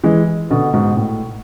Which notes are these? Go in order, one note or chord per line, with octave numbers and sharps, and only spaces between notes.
E3 G#3
B2 D3
G#2 B2
A2